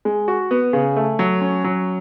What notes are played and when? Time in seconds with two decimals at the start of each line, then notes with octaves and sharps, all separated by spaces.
0.05 G#3
0.28 F#4
0.51 B3
0.73 C#3
0.96 A3
1.19 F#3
1.41 C#4
1.64 F#3